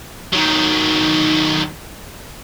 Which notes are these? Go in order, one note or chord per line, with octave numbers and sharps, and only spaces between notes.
D#3 F#3